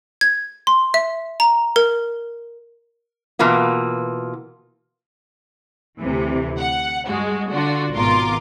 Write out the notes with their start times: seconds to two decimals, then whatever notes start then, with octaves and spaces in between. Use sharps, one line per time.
0.21 G#6
0.67 C6
0.94 E5
1.40 A#5
1.76 A#4
3.39 B2 E3 A#3 F4
5.99 D2 C3 E3
6.58 F#5
7.06 G2 G#3 F#4
7.50 D3 D4 F4 F#4
7.92 G#1 B2 F4 A#4 C6 D6